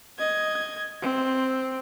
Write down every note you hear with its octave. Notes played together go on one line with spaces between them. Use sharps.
D#5 G#6
C4